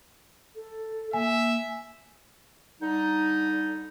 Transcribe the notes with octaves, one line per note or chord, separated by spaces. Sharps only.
A4
A#3 E5 G#5
D3 G3 D#4